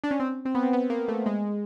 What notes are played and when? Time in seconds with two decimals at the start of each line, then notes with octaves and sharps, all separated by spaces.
0.04 D4
0.11 C#4
0.20 C4
0.45 C4
0.55 B3
0.63 C4
0.73 B3
0.90 A#3
1.08 A3
1.26 G#3